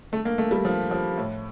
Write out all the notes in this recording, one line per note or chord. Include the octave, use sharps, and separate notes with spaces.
A3
A#3
A3
G3
F3
F3
A2